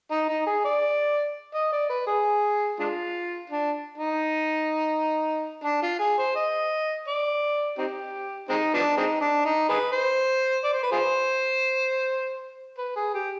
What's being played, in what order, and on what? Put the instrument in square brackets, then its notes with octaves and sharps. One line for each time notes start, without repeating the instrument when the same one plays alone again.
[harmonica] D#4
D#4
G#4
D5
D#5
D5
B4
G#4
G#3 D4 F4
D4
D#4
D4
F4
G#4
C5
D#5
D5
C4 D#4 G4
G#3 C4 D#4
F3 B3 D4
G#3 C4 D#4
D4
D#4
D#4 G#4 B4
C5
D5
C5
B4
F4 G#4 C5
B4
G#4
G4